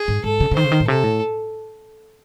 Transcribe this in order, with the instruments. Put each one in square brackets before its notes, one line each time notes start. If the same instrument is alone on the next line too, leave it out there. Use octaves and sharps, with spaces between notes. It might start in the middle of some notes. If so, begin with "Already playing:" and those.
Already playing: [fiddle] G#4
[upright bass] G#2
[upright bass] G#2 [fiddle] A4
[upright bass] C#3
C#3
[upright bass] D#3 [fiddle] C5
[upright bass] C#3
D#3
A2
[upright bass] C3 [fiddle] A4
[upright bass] A2